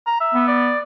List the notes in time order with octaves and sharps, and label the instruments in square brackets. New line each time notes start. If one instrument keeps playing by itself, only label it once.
[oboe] A#5
E5
[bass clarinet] B3
[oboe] D5